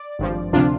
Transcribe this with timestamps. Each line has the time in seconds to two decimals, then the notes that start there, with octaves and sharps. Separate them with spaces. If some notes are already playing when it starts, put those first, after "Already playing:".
Already playing: D5
0.19 G#1 G2 F3
0.53 D2 C3 F3 D4 F4